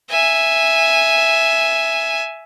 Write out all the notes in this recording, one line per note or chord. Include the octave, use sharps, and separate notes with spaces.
E5 G#5